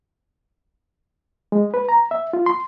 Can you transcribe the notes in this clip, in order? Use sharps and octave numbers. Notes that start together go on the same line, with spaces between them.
G#3
B4
A#5
E5
F4
C6